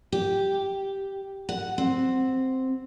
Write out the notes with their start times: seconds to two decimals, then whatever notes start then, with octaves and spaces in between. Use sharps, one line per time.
0.12 G4
1.49 F#5
1.78 C4